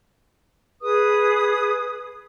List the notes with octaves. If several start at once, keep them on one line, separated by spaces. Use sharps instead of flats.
G#4 B4 D#6